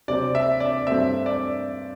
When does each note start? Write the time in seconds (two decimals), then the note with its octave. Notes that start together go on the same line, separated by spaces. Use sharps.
0.08 C3 F#3 C4 D5
0.35 E5
0.60 D5
0.87 G2 F#3 A3 C4 E5
1.26 D5